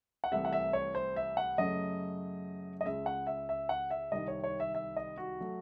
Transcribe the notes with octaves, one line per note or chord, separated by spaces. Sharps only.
F#5
C2 C3 E3 A3 E5
F#5
E5
C#5
C5
E5
F#5
F#2 C#3 F#3 A3 D#5
D#5
C#2 C#3 G#3 E5
F#5
E5
E5
F#5
E5
C2 C3 D#3 D#5
C#5
C#5
E5
E5
D#5
F#4
F#3 A3